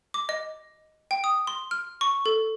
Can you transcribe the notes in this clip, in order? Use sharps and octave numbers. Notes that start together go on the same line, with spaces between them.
D6
D#5
G5
D#6
C6
F6
C#6
A4